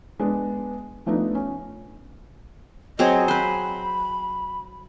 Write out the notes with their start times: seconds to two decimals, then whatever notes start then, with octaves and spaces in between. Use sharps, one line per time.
0.19 G#3 B3 D4
1.06 F3 A3 B3 D4 D#4
1.35 C#4
2.99 F#3 C4 G#4 D#5
3.28 B4 C5 B5